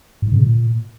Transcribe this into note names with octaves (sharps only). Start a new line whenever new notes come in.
G#2
C#3
A#2